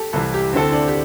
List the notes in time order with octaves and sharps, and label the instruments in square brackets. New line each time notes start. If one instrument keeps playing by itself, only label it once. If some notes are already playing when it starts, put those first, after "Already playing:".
Already playing: [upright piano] G4 A4
[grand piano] C2 C3 E3 [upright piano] A4
[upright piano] G4
[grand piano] D2 D3 C4 A4 [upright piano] E4
[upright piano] D4
G4